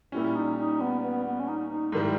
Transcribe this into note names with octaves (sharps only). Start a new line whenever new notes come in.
A#2 G3 C#4 E4
D#4
D#4
B3
B3
B3
C#4
D#4
D#4
G#2 D#3 G3 E4